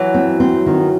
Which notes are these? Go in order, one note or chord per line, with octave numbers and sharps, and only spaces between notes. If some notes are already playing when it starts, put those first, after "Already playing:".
Already playing: E3 F#3
C4
C4
D#3